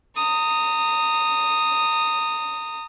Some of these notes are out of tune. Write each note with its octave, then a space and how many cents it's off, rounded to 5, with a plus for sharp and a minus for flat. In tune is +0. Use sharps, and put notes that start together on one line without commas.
A#5 -30 D#6 +0